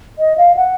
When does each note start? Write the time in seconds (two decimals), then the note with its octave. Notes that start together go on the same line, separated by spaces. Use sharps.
0.19 D#5
0.38 F5
0.57 F#5